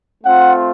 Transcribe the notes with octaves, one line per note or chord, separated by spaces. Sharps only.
A3 C4 F4 F#5